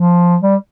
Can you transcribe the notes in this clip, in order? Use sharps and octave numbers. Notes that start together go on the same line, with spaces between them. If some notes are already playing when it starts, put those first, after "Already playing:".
Already playing: F3
G3